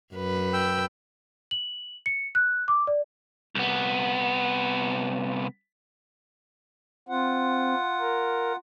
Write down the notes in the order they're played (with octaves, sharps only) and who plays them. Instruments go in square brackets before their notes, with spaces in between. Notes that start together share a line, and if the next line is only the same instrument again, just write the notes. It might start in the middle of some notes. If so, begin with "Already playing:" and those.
[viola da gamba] F#2 B4
[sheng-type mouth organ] G5 E6
[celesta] F#7
C#7
F#6
D6
D5
[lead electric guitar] C2 B3
[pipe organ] C4 [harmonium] F4 F#5
[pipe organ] A#4